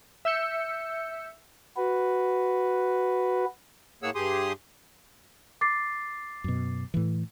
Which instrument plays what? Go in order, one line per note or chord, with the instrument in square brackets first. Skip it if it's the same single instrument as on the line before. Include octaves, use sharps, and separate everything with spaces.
[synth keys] E5 E6 G6 C#7
[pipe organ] F#4 B4
[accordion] A2 A#3 G#4 C#5 F#5 E6
G2 G4 G#4 C6 D#6
[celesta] D6 A6 C7
[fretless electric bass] F#2 B2
A2 E3